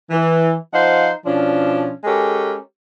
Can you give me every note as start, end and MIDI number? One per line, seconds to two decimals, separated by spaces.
0.10 0.53 52
0.73 1.10 53
0.73 1.10 63
0.73 1.10 72
0.73 1.10 77
0.73 1.10 78
1.26 1.91 47
1.26 1.91 53
1.26 1.91 61
1.26 1.91 62
2.04 2.55 56
2.04 2.55 61
2.04 2.55 67
2.04 2.55 69
2.04 2.55 70